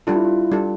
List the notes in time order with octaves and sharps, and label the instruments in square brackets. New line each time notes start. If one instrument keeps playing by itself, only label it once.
[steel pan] G3 D4 A4 [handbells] F4
[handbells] E4
F4
[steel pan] G3 D4 A4